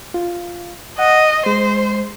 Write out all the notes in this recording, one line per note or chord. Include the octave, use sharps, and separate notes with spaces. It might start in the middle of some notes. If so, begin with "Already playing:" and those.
F4
D#5 F#5
G#3 C5